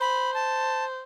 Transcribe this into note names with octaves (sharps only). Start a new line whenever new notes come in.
C5 B5
A5